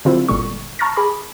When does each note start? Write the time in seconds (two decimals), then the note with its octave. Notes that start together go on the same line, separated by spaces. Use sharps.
0.05 D3 F#3 C4 E4 F4
0.28 G1 A#2 D3 G3 G#3 C#6
0.79 A5 A#5 C#6 F6 A6 A#6
0.96 G#4 B5 D6